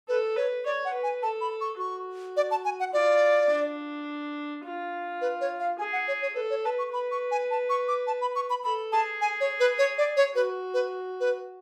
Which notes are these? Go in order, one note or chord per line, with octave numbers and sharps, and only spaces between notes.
A4 B4
B4 C#5
C#5 D5
F#5
B4
G#5
A4 A5
B5
C#6
F#4 C#6
D5
A5
G#5
F#5
F4 D5
D4
F4
B4
C#5
F5
G#4 G#5
F#5
C#5
C#5
A4 B4
C#5
B4 A5
C#6
B4 B5
C#6
G#5
A5
C#6
D6
A5
B5
C#6
B5
A4 B5
G#4 A5
G#5
C#5
B4
C#5
D5
C#5
F#4 B4
B4
B4